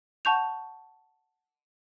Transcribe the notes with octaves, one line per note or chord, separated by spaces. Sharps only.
F#5 A5 C#6 G6 F7